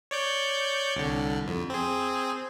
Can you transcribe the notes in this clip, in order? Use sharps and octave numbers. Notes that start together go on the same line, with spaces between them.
C#5 D5 G6
C2 D3
F2
C4 G#4